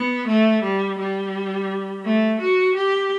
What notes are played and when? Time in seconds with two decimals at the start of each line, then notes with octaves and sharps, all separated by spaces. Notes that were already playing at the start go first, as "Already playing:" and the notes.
Already playing: B3
0.28 A3
0.63 G3
0.99 G3
2.05 A3
2.40 F#4
2.75 G4